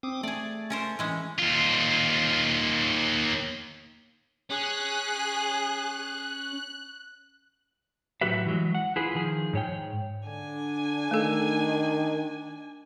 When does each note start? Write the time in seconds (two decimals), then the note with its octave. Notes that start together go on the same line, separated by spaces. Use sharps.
0.03 C4 D6 D#6
0.23 A3 G#4 D5
0.70 C#4 A#4 C5
0.99 E3 G#3 C#4
1.39 D#2 F4
4.50 C#4 G#4 F#6
8.21 A2 F#3 F#4 G4 B4 E5
8.46 E3 F#3 G#3
8.75 F#5
8.96 E4 F4 G#4 B4
9.15 D#3 F3 G#4
9.53 G#2 C#5 G5
10.25 D3 D4 G#5
11.11 D#3 A3 A4